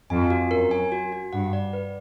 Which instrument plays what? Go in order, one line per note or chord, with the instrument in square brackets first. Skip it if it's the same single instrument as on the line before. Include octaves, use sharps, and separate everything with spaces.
[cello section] F2 [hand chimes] G#5
[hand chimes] F#4
[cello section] F#2 [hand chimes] A#4
[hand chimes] G#5
F#4
F#4
[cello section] G2 [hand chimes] F#5
[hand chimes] D5
B4